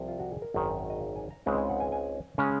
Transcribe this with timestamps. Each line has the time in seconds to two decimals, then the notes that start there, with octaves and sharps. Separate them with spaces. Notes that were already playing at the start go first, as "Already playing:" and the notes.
Already playing: C2 C3 F3
0.08 F4
0.19 F#4
0.32 G#4
0.42 A#4
0.54 G#1 F#2 D#3
0.90 D#5
1.00 F5
1.16 G#5
1.31 A#5
1.46 C#2 C#3 G#3 C4 D#4 G#5
1.58 G#5
1.69 F#5
1.80 G#5
1.92 G#5
2.38 C#3 G#3 C#4 G#5